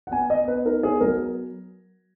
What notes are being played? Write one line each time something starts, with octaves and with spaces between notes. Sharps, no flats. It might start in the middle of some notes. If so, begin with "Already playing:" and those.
F#5
B3 G#5
B3 D#5
B3 B4
D#4 A#4
B3 G#4
F#3 A#4